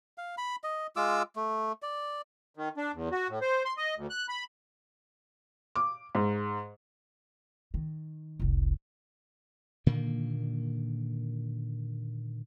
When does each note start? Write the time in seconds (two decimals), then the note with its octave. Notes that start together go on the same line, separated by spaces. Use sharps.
0.18 F5
0.38 B5
0.64 D#5
0.96 G#3 F4 D6 E6
1.36 A3
1.82 D5
2.55 D#3
2.77 D4
2.94 E2
3.12 F#4
3.29 A2
3.41 C5
3.65 C6
3.77 D#5
3.97 D2
4.10 F#6
4.28 B5
5.76 D6
6.15 G#2
7.74 D#3
8.39 F1 C2
9.86 A#2 D3 D#3 A#3